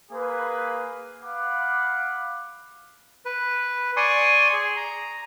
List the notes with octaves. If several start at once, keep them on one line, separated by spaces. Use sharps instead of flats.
A#3 G#4 B4
F5 F#5 B5 D6
B4
D5 G#5 C6 C#6 D#6
G#4
A#5